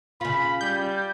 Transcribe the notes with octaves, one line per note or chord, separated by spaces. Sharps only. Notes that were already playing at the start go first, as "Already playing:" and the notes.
C#3 F4 B5
G3 G6